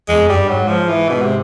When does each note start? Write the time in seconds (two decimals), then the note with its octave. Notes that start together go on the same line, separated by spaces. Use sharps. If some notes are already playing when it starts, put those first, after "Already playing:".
0.08 E2 G#3
0.19 F2
0.29 F#2 G3
0.38 G2
0.49 G#2 F#3
0.68 F3
0.89 E3
1.08 B2
1.22 C3